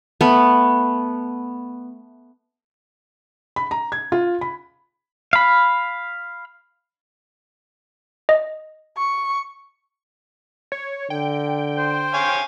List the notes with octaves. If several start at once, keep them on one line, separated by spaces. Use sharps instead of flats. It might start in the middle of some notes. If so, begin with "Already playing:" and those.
A3 B3
B5
A#5
G#6
F4
B5
F5 B5
D#5
C#6
C#5
D3 G5
C5
C#5 F5 G#5